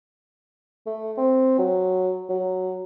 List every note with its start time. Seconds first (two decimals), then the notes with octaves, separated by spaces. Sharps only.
0.86 A3
1.17 C4
1.58 F#3
2.29 F#3